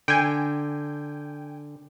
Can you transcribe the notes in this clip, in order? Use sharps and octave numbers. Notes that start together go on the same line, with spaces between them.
D3 G5 G#5